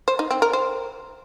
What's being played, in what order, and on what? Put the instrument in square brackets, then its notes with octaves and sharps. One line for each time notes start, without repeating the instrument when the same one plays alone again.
[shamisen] C5
D#4
C4
A#4
C5